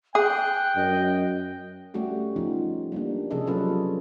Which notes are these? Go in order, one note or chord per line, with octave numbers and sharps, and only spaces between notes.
G#4 G5 F#6
F#2 D#5
G3 A3 C#4 F#4 G4
F3 C#4 D#4 F4
G3 A#3 D4
C3 F3 C#4 G#4 A4 D#5
F#3 G3 C#4 F4 A4 B4